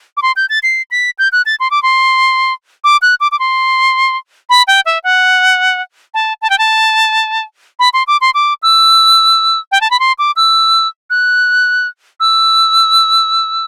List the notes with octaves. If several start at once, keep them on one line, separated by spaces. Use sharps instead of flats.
D6
C6
G6
A6
C7
B6
G6
F#6
A6
C6
D6
C6
D6
F#6
D6
D6
C6
B5
G5
E5
F#5
A5
A5
G5
A5
B5
C6
D6
C6
D6
E6
G5
A5
B5
C6
D6
E6
F#6
E6